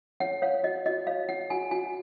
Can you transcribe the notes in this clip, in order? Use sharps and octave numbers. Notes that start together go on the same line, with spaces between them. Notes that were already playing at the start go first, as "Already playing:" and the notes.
C#5 F#5
C#5 F5
F#4 D#5
F#4 D#5
C#5 F5
C#5 F#5
F#4 G#5
F#4 G#5